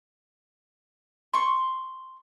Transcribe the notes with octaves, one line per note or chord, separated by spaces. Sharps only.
C6 C#6